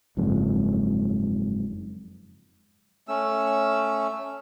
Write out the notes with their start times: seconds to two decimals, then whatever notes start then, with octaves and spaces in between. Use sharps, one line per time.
0.17 F#1 F2 G#2
3.08 A3 C#4 E6